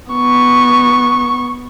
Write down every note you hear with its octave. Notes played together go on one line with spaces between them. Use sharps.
B3 C#6